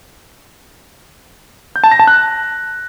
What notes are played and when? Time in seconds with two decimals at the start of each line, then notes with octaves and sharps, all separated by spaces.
1.76 G6
1.84 A5
1.92 A#6
1.99 A5
2.07 F#6